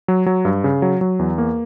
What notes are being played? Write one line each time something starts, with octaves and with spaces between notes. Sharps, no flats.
F#3
F#3
G2
C#3
F#3
F#3
E2
A#3